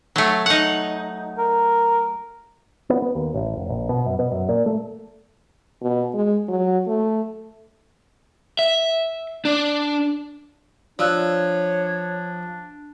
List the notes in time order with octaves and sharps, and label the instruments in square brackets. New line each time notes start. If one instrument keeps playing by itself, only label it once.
[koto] F#3 A3
D#4 F#5
[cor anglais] A#4
[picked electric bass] B3
B3
D#2
A1
F1
A#1
B2
F#2
B2
F#2
A#2
A3
[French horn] B2
G#3
F#3
A3
[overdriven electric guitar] E5
D4
[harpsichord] F3 [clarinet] D4 [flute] C#5 [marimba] D5 E6 F#6